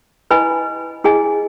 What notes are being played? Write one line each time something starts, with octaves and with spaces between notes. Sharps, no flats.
E4 B4 D#5 G#5 B5
E4 G#4 D#5 G#5